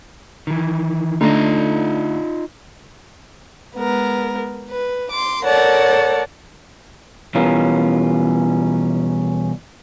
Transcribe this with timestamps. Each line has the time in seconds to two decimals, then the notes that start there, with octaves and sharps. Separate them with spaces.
0.47 D#3 E3
1.21 D3 A3 D#4 F4 D#5 A#5
3.75 G#3 B3 A#4
4.70 B4
5.11 C6 D6
5.44 A4 A#4 C#5 D5 F#5 A5
7.35 B2 E3 G3 C#4 F4 A#4